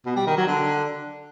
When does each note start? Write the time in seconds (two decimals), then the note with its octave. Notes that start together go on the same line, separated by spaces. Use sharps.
0.06 B2
0.16 G3
0.27 D#3
0.37 F#3
0.47 D3